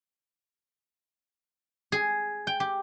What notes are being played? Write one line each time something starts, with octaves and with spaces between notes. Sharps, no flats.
G#4
G5
G4